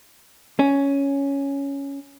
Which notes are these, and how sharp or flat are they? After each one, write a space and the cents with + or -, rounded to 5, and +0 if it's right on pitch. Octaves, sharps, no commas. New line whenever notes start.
C#4 +5